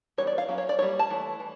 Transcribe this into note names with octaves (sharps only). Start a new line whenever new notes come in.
E3 G3 B3 D#4 C#5
D5
F5
F#3 A#3 C#4 E4
C#5
D5
G3 A#3 D#4 C#5
A5
E3 A3
E3